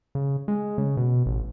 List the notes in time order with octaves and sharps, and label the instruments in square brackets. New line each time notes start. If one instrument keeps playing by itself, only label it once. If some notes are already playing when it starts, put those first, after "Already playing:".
[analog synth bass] C#3
G#3
C#3
B2
A1